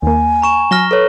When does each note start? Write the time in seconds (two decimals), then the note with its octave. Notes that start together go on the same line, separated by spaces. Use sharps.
0.02 D#2 A#3 G#5
0.42 A#5 C#6 E7
0.71 F#3 F6 A#6 G7
0.91 A4 B4 C#5